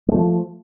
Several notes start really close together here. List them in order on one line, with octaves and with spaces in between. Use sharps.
G#3 A3 F3